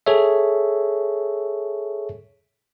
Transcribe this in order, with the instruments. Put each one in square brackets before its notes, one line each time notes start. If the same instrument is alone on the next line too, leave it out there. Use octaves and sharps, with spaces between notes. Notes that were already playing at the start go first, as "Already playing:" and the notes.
[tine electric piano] G#4 A4 C#5 E5